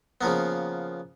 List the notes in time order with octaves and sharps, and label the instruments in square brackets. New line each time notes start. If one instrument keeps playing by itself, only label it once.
[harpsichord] C#3 F3 A#3 B3